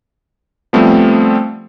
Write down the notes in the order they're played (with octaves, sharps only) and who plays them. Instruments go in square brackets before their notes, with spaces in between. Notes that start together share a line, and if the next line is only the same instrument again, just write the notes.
[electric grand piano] F3 G3 A3 B3 C4